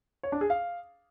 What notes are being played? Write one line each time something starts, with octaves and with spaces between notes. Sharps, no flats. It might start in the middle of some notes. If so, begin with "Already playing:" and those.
C#5
D4
G#4
F5